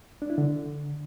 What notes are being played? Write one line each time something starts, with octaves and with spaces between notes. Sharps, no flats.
D4
E4
D3